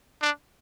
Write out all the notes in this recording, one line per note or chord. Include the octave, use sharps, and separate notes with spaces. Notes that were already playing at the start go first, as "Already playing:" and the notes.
D4